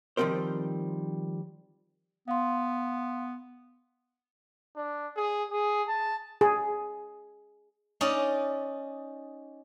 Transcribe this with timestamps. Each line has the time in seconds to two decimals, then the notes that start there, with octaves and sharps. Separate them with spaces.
0.17 D#3 F3 G3 C4 A#4 C5
2.28 B3 F5 C6
4.76 D4
5.16 G#4
5.51 G#4
5.88 A5
6.41 G#4
8.01 C#4 D#4 D5 D#5